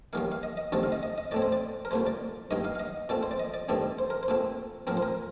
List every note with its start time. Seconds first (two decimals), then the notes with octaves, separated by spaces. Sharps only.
0.13 D#2 D#3 G3 A#3 F5
0.32 F5
0.43 D#5
0.57 D#5
0.72 D2 C3 D#3 A3 C4 D5
0.83 F5
0.92 D#5
1.03 D#5
1.18 D#5
1.31 A2 A3 C4 D5
1.42 C5
1.52 D5
1.85 A#4
1.91 C2 A#2 A3 C5
2.07 D5
2.51 G2 D#3 A#3 D#5
2.65 F5
2.75 F5
2.79 D#5
3.09 A#2 A3 C4 D5
3.23 C5
3.31 D5
3.40 D#5
3.54 D5
3.69 G2 D#3 A3 C4 D5
3.99 C5
4.10 A#4
4.23 C5
4.28 A#2 A3 C4
4.87 A2 F3 C4 A#4
4.97 C5
5.02 A#4